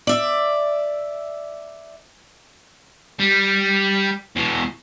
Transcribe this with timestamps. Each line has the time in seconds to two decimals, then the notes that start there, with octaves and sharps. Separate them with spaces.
0.07 D5 E5
3.19 G3
4.36 E2 B2